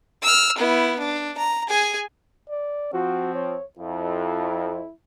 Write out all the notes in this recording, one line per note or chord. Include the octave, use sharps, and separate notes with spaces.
E6 F6
B3 E4
D4
A#5
G#4 G#5
D5
F3 C4 F#4
C#5
F2 E4